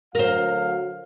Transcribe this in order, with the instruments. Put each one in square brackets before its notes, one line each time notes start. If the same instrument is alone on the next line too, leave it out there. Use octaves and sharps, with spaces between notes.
[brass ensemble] D2 F#3 F5 [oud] A#4 C5